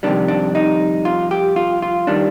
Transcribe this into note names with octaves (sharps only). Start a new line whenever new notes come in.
F2 C3 D#3 G3 D4
D4
D#4
F4
G4
F4
F4
D#3 G3 D4